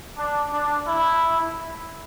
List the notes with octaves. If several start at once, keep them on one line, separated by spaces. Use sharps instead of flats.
D4
D4
E4